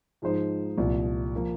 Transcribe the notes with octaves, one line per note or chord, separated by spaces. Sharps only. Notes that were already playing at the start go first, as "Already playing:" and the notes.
G#2 F3 G#3 D#4 C5
C2 A#2 F3
F3 A#3